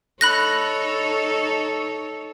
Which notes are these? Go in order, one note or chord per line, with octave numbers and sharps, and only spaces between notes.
D#4 A4 C#5 B5 F#6 A#6